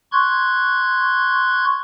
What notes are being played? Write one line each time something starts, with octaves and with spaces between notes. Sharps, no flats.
C6 C#6 F#6 G#6